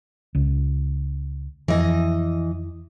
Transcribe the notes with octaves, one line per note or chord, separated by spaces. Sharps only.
C#2
F2 E3 D#5